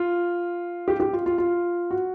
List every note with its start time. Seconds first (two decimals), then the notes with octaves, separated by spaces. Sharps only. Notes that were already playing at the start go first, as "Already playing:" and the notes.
Already playing: F4
0.88 G4
1.00 G4
1.13 F4
1.26 F4
1.38 F4
1.91 F#4